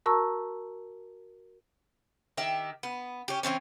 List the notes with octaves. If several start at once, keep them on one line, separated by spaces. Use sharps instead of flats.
F#4 A#4 A5 A#5 C#6 E6
D#3 G4 E5
B3
C#4 G4
E3 G3 C4 C#4